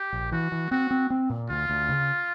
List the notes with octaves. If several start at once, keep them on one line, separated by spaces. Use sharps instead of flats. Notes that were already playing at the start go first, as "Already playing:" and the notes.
Already playing: G4
A#1
E3 F#4
E3
C4 F#4
C4
C4
A#2
D2 F4
D2
C#3